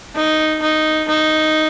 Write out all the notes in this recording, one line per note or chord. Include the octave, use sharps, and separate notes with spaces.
D#4
D#4
D#4